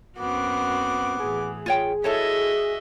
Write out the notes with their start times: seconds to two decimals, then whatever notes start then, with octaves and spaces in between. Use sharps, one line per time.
0.18 F#2 B3 C4 F#4 D6
1.19 A2 E3 G#4
1.66 F4 C#5 G5
2.04 E4 F#4 A4 C#5 D#5 E5